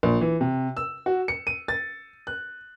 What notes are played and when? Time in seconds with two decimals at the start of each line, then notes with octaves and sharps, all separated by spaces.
0.03 A#1
0.21 E3
0.41 C3
0.77 E6
1.06 F#4
1.28 C#7
1.47 D#7
1.68 A6
2.27 F#6